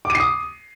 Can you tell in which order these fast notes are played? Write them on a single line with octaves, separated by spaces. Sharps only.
D6 D#7 C7 D#6